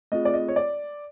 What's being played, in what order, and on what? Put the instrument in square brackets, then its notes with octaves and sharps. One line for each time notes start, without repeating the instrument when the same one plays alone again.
[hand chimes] A3 C4 F4 G#4 [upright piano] D#5
[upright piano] D5
D#5
C#5
D5